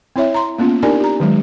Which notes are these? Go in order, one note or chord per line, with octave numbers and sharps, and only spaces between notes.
C4 E4 C#5 E5
A#5 C6
A#3 B3 C#4 F4
D4 D#4 G4 A#4 D5 G#5
G4 A#5
D#3 F#3 G#3